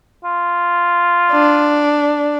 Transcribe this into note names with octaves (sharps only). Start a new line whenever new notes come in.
F4
D4